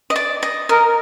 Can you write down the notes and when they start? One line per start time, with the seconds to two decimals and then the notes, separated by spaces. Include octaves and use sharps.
0.10 D#5
0.16 D5
0.43 D#5
0.69 A#4 D#5